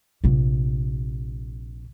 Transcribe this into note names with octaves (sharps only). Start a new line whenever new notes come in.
A#1 C3